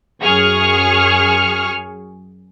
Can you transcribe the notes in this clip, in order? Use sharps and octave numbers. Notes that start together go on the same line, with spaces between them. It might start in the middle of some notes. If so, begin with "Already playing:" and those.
F#2 G#4 C#6 F6